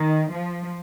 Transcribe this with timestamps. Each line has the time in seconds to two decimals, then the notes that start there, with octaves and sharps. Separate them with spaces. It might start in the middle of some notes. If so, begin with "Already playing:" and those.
Already playing: D#3
0.30 F3